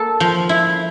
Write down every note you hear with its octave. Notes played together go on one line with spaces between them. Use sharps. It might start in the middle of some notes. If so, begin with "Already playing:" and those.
Already playing: A#3 A4
F3
E4